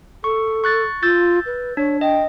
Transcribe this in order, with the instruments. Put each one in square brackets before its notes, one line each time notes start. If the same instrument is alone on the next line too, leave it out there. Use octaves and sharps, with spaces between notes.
[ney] A4 [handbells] C#6
[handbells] C#6 F#6 A6
[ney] F4 [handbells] E6 G6 A6
[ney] B4
[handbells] D4 [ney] C#5
[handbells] D#5 [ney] G5